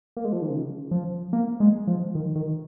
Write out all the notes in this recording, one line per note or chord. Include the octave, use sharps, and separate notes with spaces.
A#3
G#3
F3
D#3
C#3
F3
A#3
G#3
F3
D#3
D#3